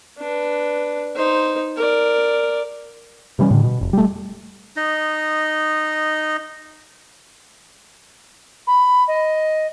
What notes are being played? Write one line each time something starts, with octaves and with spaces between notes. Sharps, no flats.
D4 B4
D#4 C5
A#4 D5
C3 E3 G3 C#4
A2 D3
B2
F1
G3 A3
D#4 D#5
B5
D#5